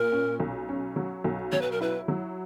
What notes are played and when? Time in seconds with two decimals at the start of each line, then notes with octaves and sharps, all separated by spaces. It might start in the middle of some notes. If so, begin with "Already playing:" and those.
Already playing: A#2 A#4
0.12 C#4
0.40 B1
0.69 C#4
0.96 F#3
1.24 B1
1.52 F#3 C#5
1.62 B4
1.72 A#4
1.81 E4 B4
2.08 F#3